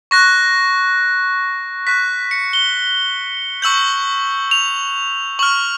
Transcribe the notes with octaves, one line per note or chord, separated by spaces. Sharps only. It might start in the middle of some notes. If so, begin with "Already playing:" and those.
C#6 F#6 A#6
C#6 F#6 B6
C#7
G7
C#6 E6 G6 F#7
F7
C#6 F6 F#7